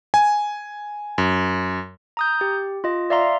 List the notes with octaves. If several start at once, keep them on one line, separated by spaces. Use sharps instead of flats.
G#5
F#2
A#5 D#6 G6
G4
F4 D#5
D5 E5 F5 A#5 C6